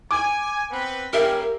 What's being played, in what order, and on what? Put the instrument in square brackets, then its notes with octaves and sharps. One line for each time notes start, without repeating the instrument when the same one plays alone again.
[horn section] G#5 [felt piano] D6
[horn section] B3 C4 B4
[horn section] G3 A#3 C#4 [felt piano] G4 E5 [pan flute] A#4